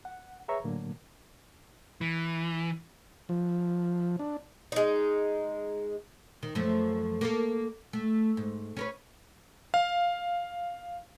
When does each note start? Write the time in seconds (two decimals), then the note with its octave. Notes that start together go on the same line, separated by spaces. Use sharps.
0.05 F#5
0.48 G#4 B4 C#5 E5 A#5 C#6
0.64 A2 D3 F#3 A#3
2.01 E3
3.29 F3
4.19 D4
4.72 G#3 D#4
6.43 D#3
6.55 F#2 F3 A3
7.21 A#3 A4
7.93 A3
8.37 G#2
8.77 C#4 A#4 B4
9.74 F5